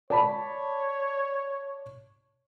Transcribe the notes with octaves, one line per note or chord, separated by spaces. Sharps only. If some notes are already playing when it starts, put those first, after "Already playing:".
C#5 D5 A5 B5